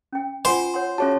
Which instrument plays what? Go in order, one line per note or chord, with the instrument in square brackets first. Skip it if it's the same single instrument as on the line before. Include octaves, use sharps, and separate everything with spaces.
[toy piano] C#4 G5
[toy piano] F4 F#5 G#5 [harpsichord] C5
[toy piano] C#5 F#5 C6
[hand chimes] C#4 C#5 A5 [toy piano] F#4 G#4 E5